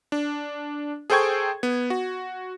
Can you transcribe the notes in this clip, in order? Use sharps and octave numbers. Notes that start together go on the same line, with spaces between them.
D4
G#4 A4 C5 G5 C#6 G#6
B3
F#4